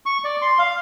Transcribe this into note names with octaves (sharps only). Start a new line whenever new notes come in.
C#6
D5
C6
F5